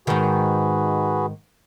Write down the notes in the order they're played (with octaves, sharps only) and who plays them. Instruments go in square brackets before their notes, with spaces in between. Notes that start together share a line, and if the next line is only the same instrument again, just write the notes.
[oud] G#2 D#3 [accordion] F#4 G#4 B4